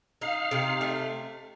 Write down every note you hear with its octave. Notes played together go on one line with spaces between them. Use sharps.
D#4 F5
C3
A3